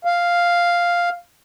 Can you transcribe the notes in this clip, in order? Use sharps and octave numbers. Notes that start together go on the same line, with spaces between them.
F5